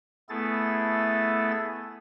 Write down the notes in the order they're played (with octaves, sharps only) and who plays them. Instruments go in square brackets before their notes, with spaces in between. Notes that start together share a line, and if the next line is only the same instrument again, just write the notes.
[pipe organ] A3 B3 E4 G#4 A4 A6